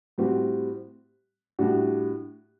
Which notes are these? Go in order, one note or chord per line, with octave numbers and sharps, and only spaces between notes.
A2 G3 C4 F#4
A2 G3 D4 F#4